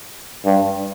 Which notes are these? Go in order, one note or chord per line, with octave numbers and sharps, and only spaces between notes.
G2